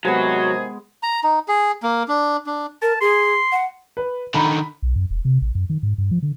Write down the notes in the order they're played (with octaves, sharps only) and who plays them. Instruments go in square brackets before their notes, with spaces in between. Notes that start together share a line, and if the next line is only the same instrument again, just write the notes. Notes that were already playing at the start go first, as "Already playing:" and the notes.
[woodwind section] C3 D#3 G#4 [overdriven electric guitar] F#3 [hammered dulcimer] G#3 B3
[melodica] A#5
D#4
G#4
A#3
D4
D4
[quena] A#4 [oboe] A5
[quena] G#4 [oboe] C6
[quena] F#5
[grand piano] B4
[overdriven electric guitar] D3 D#3 [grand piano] A#5 B5
[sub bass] B1
F#2
E1
C3
A1
F#2
D#3
G#2
G2
F3
D3